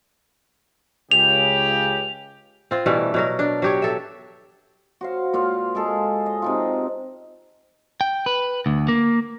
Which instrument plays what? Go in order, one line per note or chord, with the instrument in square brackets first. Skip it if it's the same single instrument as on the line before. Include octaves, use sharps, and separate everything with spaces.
[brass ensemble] C#2 C#3 G4 [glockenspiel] F7
[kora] C4 F4
B2 E3 G3 A3
B2 F#3 A#4
D4
F#3 G4 C#5
A4 E5
[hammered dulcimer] F#4 C5 F5
A#2 F4 F5
G#3 G#4 A4
D#5
C3 D#4 F4
[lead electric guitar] G5
B4
D2
A#3